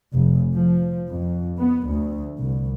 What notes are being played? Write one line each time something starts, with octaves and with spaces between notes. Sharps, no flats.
F1
F3
F2
B3
D2
C2